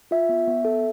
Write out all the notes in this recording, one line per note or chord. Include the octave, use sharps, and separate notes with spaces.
F4 E5
B3
B3
A4